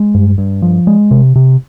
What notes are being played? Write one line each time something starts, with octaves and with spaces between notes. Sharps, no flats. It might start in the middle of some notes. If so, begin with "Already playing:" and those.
Already playing: G#3
G2
G2
F3
G#3
C3
C3